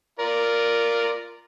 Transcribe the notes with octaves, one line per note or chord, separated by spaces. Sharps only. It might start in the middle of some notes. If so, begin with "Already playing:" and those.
F4 A#4 D5